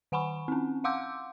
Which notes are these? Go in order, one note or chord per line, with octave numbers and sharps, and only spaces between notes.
D#3 F#5 G#5 B5 C#6
C4 C#4
F5 F#5 C6 D6 E6 G6